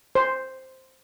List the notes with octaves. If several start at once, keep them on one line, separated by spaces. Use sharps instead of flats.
C5